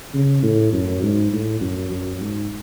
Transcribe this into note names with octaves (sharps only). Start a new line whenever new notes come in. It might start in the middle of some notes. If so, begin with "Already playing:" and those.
C#3
A2
F#2
G#2
A2
F#2
F#2
G#2